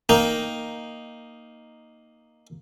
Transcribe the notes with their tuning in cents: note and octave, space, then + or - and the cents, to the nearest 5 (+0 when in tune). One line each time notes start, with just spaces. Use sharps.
A#3 +0 D#4 +0 G5 +0